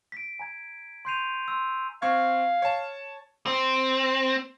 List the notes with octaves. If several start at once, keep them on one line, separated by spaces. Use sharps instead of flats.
B6 D7
G#5 A#5 G#6
C6 C#6 G6 C7 D#7 F7
C6 E6
C4 F5 C#6 G#6
C#5 A5
C4